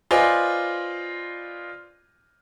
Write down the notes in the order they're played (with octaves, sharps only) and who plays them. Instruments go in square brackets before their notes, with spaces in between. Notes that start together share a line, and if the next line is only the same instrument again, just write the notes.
[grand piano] F4 B4 C5 D5 D#5 G#5